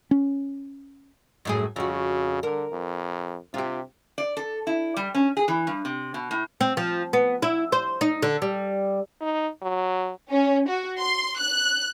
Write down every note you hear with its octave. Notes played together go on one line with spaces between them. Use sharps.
C#4
F#2 A2 G#4
F2 C#3 F#4
D3 A#4
F2
C3 F4 G4
D5
A4
E4
G3
C#4
G#4
E3
G2
C3
B2
A2
C4
F3
B3
E4
C5
D#4
D3
G3
D#4
F#3
C#4
F#4
C6
F#6